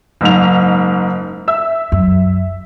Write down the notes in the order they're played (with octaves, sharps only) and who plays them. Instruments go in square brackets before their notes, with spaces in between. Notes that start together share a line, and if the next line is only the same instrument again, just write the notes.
[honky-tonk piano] F#1 G#2 F7
E5 E6
[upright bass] F#2